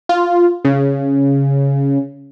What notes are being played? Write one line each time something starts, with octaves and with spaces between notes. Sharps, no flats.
F4
C#3